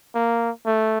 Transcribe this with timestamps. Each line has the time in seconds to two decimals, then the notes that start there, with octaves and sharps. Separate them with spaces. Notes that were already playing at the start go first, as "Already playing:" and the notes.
0.15 A#3
0.66 A3